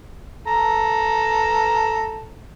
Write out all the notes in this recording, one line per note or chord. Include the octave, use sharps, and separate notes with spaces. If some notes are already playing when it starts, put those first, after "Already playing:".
A4 A#5